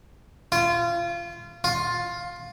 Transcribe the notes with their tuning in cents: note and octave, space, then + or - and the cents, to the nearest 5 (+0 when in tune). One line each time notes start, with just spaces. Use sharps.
F4 -25
F4 +10